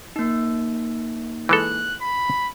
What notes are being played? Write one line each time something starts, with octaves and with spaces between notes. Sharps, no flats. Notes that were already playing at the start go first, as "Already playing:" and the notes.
A#3 D#4
E3 G#3 A4 F#6
B5